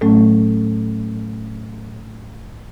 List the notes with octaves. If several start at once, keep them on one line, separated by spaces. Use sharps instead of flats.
A2 F#3 A3 C#4